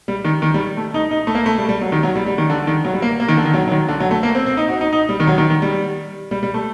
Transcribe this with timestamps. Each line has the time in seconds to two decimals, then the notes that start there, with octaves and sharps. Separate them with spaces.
0.08 G3
0.24 D#3
0.42 D#3
0.54 G3
0.77 A3
0.94 D#4
1.11 D#4
1.27 A3
1.35 A#3
1.46 A3
1.58 G3
1.69 G3
1.81 F#3
1.92 D#3
2.03 F#3
2.15 G3
2.26 G3
2.38 D#3
2.50 D3
2.67 D#3
2.85 F#3
2.94 G3
3.02 A#3
3.20 A#3
3.28 D#3
3.37 D3
3.45 D#3
3.53 F#3
3.67 F#3
3.72 D#3
3.88 D3
4.00 F#3
4.11 A3
4.23 A#3
4.35 C4
4.46 C4
4.57 D#4
4.69 F#4
4.81 D#4
4.92 D#4
5.09 G3
5.20 D#3
5.27 F#3
5.38 D#3
5.50 D#3
5.62 G3
6.31 G3
6.43 G3
6.54 A3